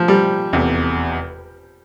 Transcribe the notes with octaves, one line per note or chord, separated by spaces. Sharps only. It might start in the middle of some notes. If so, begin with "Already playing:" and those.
Already playing: F3
G3
F1 E2 C3